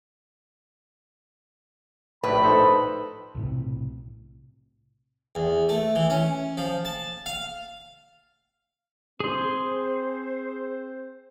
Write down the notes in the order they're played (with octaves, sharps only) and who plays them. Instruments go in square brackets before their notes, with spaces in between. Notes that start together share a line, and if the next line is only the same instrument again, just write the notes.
[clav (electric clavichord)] A#1 A2 G4 [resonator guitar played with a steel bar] B4 [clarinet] B5
[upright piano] D#4 A4 C5
[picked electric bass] B1 A2 C3
[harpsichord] E2
A3
E3
C#4
F3
A5
F5
[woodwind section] C4 C5 [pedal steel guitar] G#4 C6